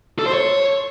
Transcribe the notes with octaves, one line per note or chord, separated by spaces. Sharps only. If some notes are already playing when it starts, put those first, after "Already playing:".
A4
C5
C#5